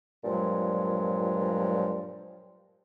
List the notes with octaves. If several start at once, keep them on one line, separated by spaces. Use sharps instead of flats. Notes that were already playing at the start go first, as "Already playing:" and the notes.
G2 A#2 F3 F#3 G#3